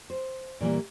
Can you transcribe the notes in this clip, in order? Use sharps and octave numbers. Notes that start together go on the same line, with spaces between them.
C5
A#2 E3 G3 A#3